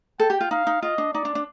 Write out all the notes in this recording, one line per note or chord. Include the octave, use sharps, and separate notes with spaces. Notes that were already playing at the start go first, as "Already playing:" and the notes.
A4 G5
G4
F4
D#4 F5
D#4
F4 D#5
D4
D#4 D5
D4
D4